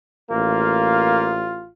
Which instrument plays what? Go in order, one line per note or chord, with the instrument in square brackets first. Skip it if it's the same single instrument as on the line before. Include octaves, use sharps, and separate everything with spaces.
[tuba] A1 [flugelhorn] A#3 [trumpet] F4